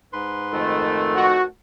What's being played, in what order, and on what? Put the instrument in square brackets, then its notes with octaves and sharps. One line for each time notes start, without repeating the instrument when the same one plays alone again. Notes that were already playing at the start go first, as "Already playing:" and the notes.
[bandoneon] G#2 B4 C6
[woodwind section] F2 D#3 A3
[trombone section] F#4